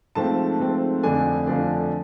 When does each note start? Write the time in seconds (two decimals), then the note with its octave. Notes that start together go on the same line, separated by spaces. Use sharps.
0.15 G#2 F3 A3 C4 A5
0.59 G#2 F3 A3 C4
1.03 F2 D3 F3 A3 D4 G#5
1.47 F2 D3 F3 A3 D4